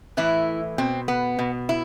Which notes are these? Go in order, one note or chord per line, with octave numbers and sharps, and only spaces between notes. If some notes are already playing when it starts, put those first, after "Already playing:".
A2 E3 E4
B2 C4
B3
B2
E4